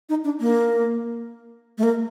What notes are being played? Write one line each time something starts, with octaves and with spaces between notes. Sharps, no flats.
D#4
D4
A#3
A3
A#3